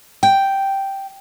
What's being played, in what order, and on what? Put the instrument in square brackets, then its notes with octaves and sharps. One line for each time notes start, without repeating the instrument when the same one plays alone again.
[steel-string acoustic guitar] G5